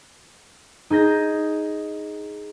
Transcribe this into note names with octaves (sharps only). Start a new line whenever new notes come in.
D#4 G#4 G6 A#6